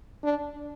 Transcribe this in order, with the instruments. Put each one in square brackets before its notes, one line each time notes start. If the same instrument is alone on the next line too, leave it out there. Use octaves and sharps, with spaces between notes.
[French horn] D4